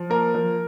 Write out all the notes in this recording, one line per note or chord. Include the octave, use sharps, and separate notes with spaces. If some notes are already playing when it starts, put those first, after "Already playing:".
Already playing: F3
A#3 A#4
F3